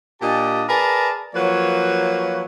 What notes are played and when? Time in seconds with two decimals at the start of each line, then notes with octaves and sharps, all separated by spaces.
0.22 A#2 D4 G4 D#5 A5
0.69 G#4 A#4 B4 D5 A5 A#5
1.35 F3 F#3 A#3 B4 C#5